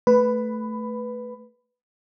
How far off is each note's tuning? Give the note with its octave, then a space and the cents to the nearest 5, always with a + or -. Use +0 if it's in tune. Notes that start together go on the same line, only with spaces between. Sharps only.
A3 +0 B4 +0 B5 +15